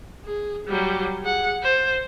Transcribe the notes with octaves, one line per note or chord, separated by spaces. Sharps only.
G#4
F#3 G3
G#4 F#5
C5